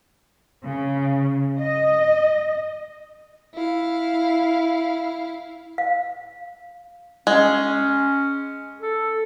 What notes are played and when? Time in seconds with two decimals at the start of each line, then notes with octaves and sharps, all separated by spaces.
0.65 C#3
1.59 D#5
3.54 E4 F5
5.78 F5
7.27 G#3 C#4
8.81 A4